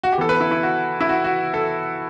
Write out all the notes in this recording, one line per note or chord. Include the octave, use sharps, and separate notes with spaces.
F#4
G4
E3 B3 A4
B4
E4
E4
F#4
E4
F#4
F#4
A4